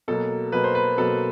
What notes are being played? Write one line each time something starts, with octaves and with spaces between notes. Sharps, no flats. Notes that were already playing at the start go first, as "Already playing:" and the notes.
B2 F#3 A#3 A4
B2 F#3 A#3 B4
C5
B4
B2 F#3 A#3 A4